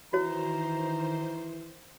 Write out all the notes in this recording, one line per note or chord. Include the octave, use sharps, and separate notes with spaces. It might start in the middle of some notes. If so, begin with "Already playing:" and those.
D#3 E3 F#4 C5 C#5 A#5